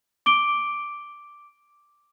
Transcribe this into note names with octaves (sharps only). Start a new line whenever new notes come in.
D6 D7 G7